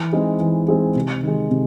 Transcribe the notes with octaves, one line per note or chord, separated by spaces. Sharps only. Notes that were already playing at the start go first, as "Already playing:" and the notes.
Already playing: E3
G#3 C4 D#4 G#4
E3
G#3 C4 D#4 G#4
C3
D#3 G#3
C3